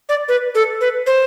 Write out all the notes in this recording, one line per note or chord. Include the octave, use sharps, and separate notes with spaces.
D5
B4
A4
B4
C5